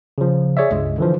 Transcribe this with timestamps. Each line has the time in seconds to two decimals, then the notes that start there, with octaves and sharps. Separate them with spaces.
0.18 C#3 F3
0.57 G#4 C#5 D5 E5
0.71 C#2 G2 G#3
0.98 D3 E3 F3